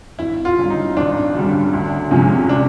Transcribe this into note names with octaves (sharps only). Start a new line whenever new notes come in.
G#1 E4
F4
F#2 D3 G3
D#4
G#1 D4
F#2 D3 G3
D2
C3 F3 G#3 C#4
D4